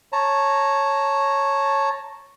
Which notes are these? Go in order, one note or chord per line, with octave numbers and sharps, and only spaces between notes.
C#5 A5 A#5